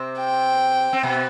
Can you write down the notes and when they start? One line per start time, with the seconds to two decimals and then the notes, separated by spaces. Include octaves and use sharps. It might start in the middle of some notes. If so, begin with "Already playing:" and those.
Already playing: C3 C4
0.19 G5
0.93 C4
1.03 B2 B3